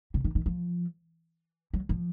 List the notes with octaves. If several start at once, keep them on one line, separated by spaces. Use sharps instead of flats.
C#3
D#3
D#3
F3
F#3
F3